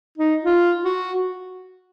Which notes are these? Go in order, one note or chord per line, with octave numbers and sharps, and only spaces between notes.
D#4
F4
F#4